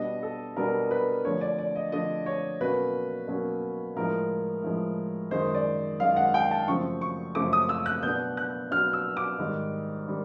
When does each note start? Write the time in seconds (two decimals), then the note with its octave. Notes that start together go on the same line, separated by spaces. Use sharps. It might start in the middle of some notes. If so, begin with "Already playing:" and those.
Already playing: B2 G3 B3 D4 D#5
0.23 A4
0.56 B2 G3 B3 D4 A#4
0.91 B4
1.24 D3 F3 A3 D4 C#5
1.41 D5
1.58 D5
1.75 D#5
1.92 D3 F3 A3 D4 D#5
2.26 C#5
2.61 B2 F#3 A#3 C#4 B4
3.28 B2 F#3 A#3 C#4
3.96 A2 F3 G#3 A#4
4.63 A2 F3 G#3
5.31 F#2 D#3 G#3 C5
5.55 D5
6.00 F#2 D#3 G#3 F5
6.16 F#5
6.34 G5
6.51 A5
6.68 F#2 C#3 F3 A3 C4 C#6
7.01 C#6
7.35 F#2 C#3 F3 A3 C4 D6
7.53 D#6
7.69 E6
7.86 F#6
8.03 B2 F#3 B3 D4 G6
8.37 F#6
8.71 B2 F#3 B3 D4 F6
8.93 E6
9.17 D6
9.39 G#2 D#3 G3
10.08 D#3 G3